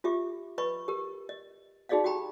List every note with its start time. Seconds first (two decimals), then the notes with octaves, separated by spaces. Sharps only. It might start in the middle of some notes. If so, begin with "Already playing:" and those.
0.04 F4 G4 E5 D6
0.58 B4 D#5 B5 C#6
0.88 G4 A#4
1.29 D#5
1.89 D#4 F#4 G#4 D5 D#5 F5
2.04 F#4 G4 G5 A#5 B5